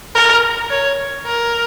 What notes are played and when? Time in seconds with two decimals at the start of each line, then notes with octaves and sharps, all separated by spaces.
0.15 A#4
0.70 C#5
1.26 A#4